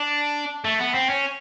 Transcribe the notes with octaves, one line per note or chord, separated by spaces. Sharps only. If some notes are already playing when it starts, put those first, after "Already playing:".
Already playing: D4
A3
B3
C4
C#4